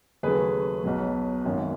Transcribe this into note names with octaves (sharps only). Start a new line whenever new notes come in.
D#2 C#3 F#3 A3 G#4 B4
B1 B2 F#3
G#1 F#2 D#3